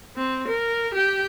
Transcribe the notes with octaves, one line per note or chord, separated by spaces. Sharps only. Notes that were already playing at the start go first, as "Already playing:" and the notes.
C4
A#4
G4 G5